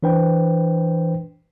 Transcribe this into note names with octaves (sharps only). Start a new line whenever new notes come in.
E3 D4 B4 C5 G5